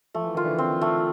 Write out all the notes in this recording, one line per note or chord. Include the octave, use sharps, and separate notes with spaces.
F3 A3
E3
D#3 F4
D3 E3
C4
A3